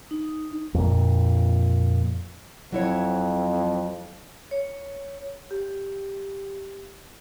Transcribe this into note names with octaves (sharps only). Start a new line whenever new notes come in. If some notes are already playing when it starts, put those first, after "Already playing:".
D#4
F2 A#2
F2 F#3 E4 C#5
C#5
G4